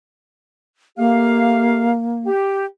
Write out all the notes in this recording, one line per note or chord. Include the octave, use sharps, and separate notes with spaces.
A3 A#3 G4 F5
G4